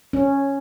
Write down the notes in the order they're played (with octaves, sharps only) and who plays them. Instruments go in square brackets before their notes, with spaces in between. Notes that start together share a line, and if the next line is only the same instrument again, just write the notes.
[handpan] C#4